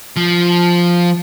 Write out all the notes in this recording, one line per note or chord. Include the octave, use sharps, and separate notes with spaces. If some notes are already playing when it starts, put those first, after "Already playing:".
F3